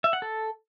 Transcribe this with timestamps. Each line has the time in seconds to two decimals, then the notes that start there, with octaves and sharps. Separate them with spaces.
0.04 E5
0.13 F#5
0.22 A4